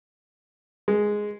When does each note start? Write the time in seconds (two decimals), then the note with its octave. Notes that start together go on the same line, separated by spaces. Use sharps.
0.88 G#3